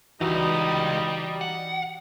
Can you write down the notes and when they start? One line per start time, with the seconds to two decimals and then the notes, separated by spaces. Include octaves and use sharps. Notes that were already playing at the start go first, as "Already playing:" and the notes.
0.21 C#2 F#2 E3 G3 D#4 F#4 D#5 E6
1.41 F#5